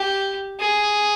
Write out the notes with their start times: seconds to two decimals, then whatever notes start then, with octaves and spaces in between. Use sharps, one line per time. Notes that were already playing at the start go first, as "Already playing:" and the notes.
Already playing: G4
0.60 G#4